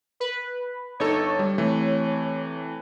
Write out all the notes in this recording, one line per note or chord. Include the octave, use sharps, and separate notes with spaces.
B4
G1 D#4 A4 C#5
G3
C3 E3 A3